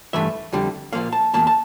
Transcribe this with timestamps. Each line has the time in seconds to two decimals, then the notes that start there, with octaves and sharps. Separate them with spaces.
0.13 G2 E3 A3 E5
0.53 F2 D3 G3
0.93 A#2 F3 A#3 F5
1.13 A5
1.34 E2 E3 A#3 A5
1.47 A5